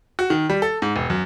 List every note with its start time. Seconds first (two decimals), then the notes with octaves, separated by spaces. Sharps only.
0.19 F#4
0.30 D#3
0.50 G3
0.62 A4
0.82 G#2
0.96 E1
1.10 F#2